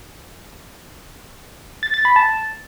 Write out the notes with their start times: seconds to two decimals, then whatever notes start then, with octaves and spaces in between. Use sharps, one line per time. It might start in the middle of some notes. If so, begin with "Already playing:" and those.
1.83 A6
1.94 A6
2.05 B5
2.16 A5